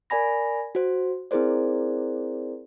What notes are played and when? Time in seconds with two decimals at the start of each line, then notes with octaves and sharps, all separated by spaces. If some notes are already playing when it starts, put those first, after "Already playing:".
0.10 A#4 D5 G#5 B5 A#6
0.75 F#4 C5
1.31 C4 E4 G#4 A#4 C5 D5